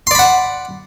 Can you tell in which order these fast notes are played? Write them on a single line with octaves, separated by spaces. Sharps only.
C6 D5 B5 F#5